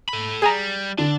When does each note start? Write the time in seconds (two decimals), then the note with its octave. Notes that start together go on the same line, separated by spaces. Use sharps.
0.09 A4 B5
0.42 G3 G#4 G#5 A#5
0.98 D3 D4